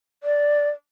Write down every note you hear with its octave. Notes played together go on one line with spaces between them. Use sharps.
D5